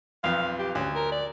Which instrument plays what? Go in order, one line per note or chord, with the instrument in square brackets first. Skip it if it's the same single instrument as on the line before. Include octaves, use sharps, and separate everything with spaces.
[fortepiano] B1 F2 [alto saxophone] F5
[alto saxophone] G4
[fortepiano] D2 [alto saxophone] C#4
[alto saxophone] A#4
D5